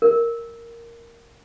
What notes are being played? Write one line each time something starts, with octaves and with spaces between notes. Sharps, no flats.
A#4